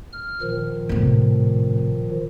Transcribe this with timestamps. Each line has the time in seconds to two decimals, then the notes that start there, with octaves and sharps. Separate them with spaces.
0.13 F6
0.42 A#2 D#3 F3
0.89 A2 C3